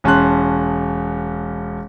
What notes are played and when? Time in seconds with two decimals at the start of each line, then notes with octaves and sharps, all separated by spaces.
0.04 E1 C#4 A5 C6 F#6